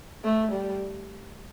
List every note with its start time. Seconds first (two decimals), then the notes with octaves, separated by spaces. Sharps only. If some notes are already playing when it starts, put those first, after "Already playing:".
0.24 A3
0.52 G3